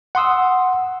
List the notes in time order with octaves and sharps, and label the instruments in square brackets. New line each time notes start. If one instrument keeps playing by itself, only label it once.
[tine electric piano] F#5 C6 D#6 E6